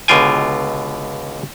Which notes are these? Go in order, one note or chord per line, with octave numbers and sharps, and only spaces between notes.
C#2 B2 D3 F4 G5 G#5